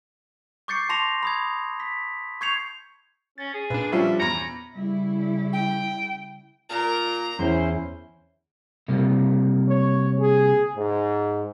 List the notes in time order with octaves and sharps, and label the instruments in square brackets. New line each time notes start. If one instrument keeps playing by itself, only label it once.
[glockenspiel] C#6 D6 G6 A6 C7 C#7
A5 C6 A#6 F7
B5 D#6 G#6
B6
C#6 G6 G#6 C7 C#7 F7
[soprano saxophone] C#4 [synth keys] A6
[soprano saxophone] G#4
[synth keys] A#2 D4 [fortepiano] B4
[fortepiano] F3 G3 C#4 [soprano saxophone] E5
[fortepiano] E2 [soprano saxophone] A#5 [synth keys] B5 C#7
[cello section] C#3 G3 E4
[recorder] G5
[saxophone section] A#2 F4 [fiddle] A#4 A#5
[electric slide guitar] E2 [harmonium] C#4 E4 [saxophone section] C5
[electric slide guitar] C3 G3 A#3
[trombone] C#5
G#4
G#2